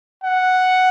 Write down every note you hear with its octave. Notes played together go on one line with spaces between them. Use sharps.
F#5